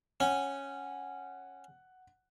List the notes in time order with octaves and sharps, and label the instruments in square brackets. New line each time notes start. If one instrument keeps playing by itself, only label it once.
[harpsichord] C#4 [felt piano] F#5